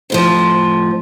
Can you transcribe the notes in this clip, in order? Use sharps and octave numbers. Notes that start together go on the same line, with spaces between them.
F2 A2 F3